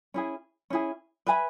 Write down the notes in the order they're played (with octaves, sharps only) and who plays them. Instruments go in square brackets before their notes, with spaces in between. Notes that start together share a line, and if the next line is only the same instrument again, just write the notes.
[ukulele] C#4 E4 G#4
C#4 E4 G#4
B4 E5 G#5 B5